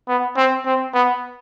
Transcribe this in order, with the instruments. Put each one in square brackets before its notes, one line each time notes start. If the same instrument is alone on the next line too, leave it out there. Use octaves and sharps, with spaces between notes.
[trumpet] B3
C4
C4
B3